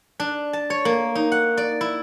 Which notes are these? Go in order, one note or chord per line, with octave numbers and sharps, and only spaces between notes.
D4
A5
C#5
A#3
D#4
F#5
D5
E4